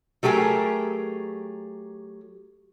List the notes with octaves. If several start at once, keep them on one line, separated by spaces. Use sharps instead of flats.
F#3 A3 G4 G#4 A#4